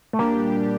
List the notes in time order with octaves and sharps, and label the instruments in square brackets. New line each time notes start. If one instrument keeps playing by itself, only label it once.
[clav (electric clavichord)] A3
[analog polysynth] A#2 G3 D4 G4 [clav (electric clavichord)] A#3
[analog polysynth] A#2